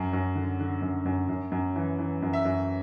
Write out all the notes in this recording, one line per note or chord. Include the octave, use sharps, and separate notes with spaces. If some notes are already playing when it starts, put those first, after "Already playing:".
Already playing: F#2
F#2
D3
D3
F#2
F#2
F#2
F#2
E3
E3
F#2
E5
F#2